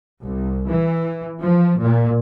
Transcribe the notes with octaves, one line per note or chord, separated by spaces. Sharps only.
C2
E3
F3
A#2